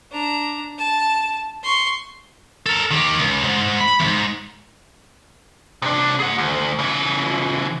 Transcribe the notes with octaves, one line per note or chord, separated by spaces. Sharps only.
D4 A#5
A5
C6 C#6
A4 A#4
D#3 G4
C#2
G#2
B5
E2 G#2
C3 D4
G#4 F#5
D2
C#3 E3